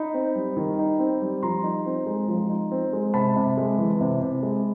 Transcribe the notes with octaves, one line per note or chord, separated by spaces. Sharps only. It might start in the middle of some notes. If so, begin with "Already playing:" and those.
Already playing: D#4 B5
C4
G3
D#3
D#4
C4
G3
F3 A#5 C6
D#4
C4
G#3
F3
D#4
C4
G#3
C3 A5 B5
C3
G#3
E3
C3
C3
G#3